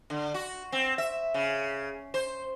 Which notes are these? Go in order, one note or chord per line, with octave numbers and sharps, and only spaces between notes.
D3
F#4
C4
E5
C#3
C5